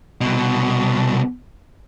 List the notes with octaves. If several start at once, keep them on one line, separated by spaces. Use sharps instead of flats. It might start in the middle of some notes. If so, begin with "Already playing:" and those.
C2 B2